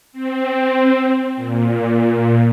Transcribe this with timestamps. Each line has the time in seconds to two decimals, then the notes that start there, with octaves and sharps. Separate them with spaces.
0.12 C4
1.36 A#2